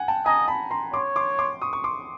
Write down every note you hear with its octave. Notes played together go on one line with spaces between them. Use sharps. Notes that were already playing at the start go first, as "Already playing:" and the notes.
Already playing: F#5 G#5
G5 A5
D#5 G#5 A#5
A5 B5
A#5 C6
C#5 C6 D6
C6 D6
C6 D6
C#6 D#6
C#6
C6 D6